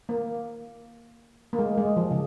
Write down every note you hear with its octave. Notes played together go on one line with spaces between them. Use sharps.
A#3
A#3
G#3
G#3
F3
C#3